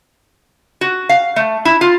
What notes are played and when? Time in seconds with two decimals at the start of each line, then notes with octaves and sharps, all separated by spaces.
0.81 F#4
1.09 F5
1.36 A3
1.65 E4
1.81 F4